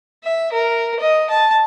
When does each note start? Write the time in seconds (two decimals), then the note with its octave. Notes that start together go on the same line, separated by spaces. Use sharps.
0.24 E5
0.53 A#4
1.00 D#5
1.30 A5